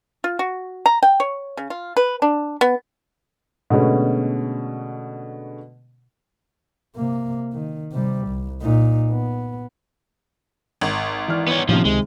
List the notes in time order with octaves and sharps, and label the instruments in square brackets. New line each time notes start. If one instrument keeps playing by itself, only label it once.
[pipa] F4
F#4
A#5
G5
C#5
C#3
F4
B4
D4
B3
[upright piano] B2 D3 G#3 A3 B3 C#4
[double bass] C3 A#3
D#3
C3 G3
C2
A#2 D#4
B3
[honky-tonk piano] G#1
[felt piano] E3 D5 F6
[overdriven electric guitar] B3 C#5
[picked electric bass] A2 A#3 C#4 [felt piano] C3 D#3 [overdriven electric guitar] F3
[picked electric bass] C#2 [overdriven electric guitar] G#3